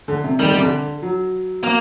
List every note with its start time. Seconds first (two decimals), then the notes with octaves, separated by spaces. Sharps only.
0.08 D3
0.24 C3
0.39 D#3 G3
0.47 D3
0.55 C3
0.62 D3
1.02 F#3
1.64 A#3